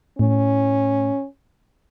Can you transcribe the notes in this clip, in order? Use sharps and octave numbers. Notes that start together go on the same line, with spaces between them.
A2 C#4